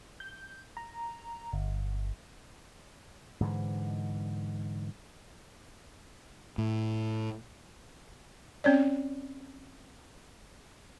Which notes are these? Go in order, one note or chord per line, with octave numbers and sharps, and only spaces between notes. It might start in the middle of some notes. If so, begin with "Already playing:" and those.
G6
A#5
G1
G#2 D3 E3
A2
C4 C#4 C#5 D5